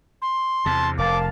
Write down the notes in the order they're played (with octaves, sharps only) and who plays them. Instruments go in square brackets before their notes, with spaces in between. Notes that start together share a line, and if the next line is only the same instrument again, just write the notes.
[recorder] C6
[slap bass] E2 C3 [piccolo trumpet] A5
[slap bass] F1 [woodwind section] A#3 F5 A5 [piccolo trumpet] D6